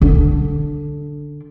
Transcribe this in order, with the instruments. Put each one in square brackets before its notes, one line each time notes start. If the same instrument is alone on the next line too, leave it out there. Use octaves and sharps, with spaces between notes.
[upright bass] D3 D4